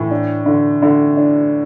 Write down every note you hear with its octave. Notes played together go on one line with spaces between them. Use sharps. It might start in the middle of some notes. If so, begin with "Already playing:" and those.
Already playing: A2 E3
D4
D3
D3
D4